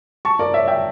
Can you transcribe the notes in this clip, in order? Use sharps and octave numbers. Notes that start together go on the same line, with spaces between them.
A5 C#6
A#4 D5
C#5 E5
E5 G5